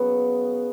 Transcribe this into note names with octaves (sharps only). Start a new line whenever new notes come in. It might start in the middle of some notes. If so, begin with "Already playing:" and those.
Already playing: C#3 F#3 B3